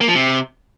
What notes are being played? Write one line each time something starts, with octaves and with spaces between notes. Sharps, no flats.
A#3
F3
C3